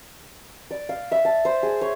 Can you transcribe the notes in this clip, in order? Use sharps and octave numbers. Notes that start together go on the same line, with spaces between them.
D5
F5
E5
A5
C5
G#4
C#5